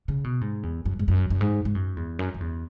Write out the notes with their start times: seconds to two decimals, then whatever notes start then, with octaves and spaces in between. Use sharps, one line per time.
0.08 C#3
0.24 B2
0.41 G#2
0.63 E2
0.85 F#2
0.99 G#2
1.08 F#2
1.30 F#2
1.41 G#2
1.65 G#2
1.75 F#2
1.97 E2
2.19 F#2
2.34 F#2
2.40 E2